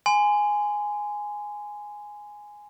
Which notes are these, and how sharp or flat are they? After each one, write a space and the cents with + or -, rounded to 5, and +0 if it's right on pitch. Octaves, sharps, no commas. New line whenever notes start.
G#5 +0 C6 -30